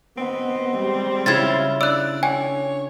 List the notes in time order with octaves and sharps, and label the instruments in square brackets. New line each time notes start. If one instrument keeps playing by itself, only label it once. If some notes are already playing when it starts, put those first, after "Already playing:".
[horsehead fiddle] B3 D#5 [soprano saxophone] C4
[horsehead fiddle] G3 G#3
[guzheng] C#3 E4 F4 [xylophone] G#6 A6
[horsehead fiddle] D4 [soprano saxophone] D5 [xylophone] E6 F#6
[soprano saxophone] C#5 [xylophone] G5 G#5